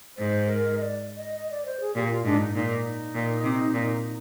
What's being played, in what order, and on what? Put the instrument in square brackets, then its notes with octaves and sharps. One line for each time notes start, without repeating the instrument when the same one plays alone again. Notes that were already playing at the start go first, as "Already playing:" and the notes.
[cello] G#2 [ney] C5
[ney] A#4
D#5
D5
D#5
D#5
D5
C5
G#4
[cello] A#2 [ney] G4
[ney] F4
[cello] G#2 [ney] D4
[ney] D#4
[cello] A#2 [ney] D#4
[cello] A#2
C3
A#2